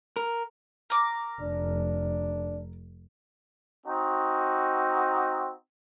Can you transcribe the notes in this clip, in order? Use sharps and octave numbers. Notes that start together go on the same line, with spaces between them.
A#4
A#4 D6
F1 D4
C4 D#4 F#4